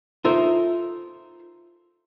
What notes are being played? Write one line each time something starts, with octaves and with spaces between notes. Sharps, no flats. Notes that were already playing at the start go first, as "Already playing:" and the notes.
D#4 F4 A4 A#4 C5 E5